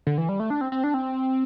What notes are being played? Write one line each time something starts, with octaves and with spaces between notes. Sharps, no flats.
D3
E3
G3
A3
D4
C4
C4
D4
C4